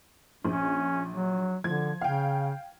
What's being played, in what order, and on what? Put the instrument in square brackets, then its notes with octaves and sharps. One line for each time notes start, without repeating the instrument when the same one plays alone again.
[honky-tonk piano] A#1 [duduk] C#4
[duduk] F#3
[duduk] D3 [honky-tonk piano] F3 G#6
[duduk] C#3 [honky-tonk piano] F5 G5